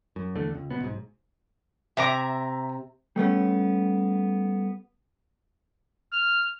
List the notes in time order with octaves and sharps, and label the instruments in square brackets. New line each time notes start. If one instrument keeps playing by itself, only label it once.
[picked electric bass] F#2
E2 D3 A3
C#2
D1 C#2 B2 B3
B1 G#2
[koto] C3 [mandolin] E5 A#5 D6
[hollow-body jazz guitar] G3 A3 B3 C#4
[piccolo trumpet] F6